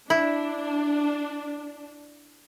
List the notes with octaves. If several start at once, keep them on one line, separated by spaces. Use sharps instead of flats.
D4 E4